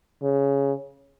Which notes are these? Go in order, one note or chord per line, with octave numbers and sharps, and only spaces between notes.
C#3